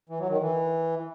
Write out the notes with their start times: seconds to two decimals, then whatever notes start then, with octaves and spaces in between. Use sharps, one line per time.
0.09 E3
0.20 F#3
0.30 D#3
0.40 E3